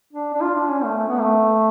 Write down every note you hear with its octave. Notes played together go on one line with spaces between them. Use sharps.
D4
D4
F4
D4
C#4
A3
A3
B3
A3